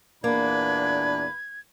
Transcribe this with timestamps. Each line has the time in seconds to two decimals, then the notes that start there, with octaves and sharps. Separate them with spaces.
0.24 E2 A#2 A#3 D4 B4 G#6